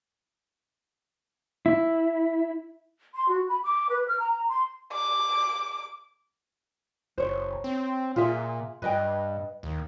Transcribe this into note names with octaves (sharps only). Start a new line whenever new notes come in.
E4
C6
F#4
B5
D6
B4
F6
A#5
C6
D6
F#1 C5 C#5
C4
A#2 F4 G#4 E5
G2 B4 D#5 G5
D#2